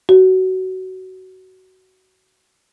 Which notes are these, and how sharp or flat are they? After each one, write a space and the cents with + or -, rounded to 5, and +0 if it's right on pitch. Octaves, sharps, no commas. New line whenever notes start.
F#4 +20